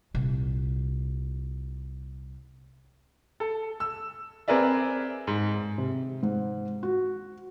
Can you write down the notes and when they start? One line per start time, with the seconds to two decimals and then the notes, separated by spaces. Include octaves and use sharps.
0.14 C2 A#2
3.40 A4
3.80 E6
4.48 C4 G#4 A#4 B4 D5 E5
5.27 G#2
5.78 C3
6.23 G#2
6.83 F#4